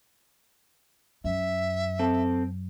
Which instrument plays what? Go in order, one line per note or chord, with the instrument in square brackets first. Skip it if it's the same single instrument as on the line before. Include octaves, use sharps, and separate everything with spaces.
[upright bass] F#2 [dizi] E5
[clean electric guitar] C4 A4